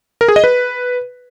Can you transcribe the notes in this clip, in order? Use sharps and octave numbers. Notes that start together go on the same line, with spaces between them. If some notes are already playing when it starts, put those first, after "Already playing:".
A#4
G#4
D#5
B4